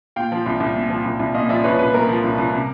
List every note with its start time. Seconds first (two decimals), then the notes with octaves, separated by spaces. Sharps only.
0.16 A#2 F5 G5
0.32 F3
0.46 C2
0.60 C2
0.76 A#2
0.90 F3
1.05 C2
1.19 C2
1.34 A#2 D#5 F5
1.49 F3 D5 E5
1.64 C2 B4 C#5
1.79 C2 B4
1.93 A#2 A#4
2.09 F3
2.23 C2
2.38 C2
2.53 C3